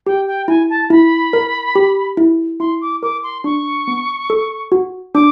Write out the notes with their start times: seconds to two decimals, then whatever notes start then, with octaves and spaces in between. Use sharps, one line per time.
0.06 G4 G5
0.27 G5
0.48 E4 G#5
0.70 A5
0.90 E4 B5
1.33 A#4
1.75 G4
2.17 E4
2.60 E4 C6
2.81 D6
3.03 A#4 D6
3.23 C6
3.44 D4 C#6
3.88 B3
4.30 A4
4.72 F#4
5.15 D4 D6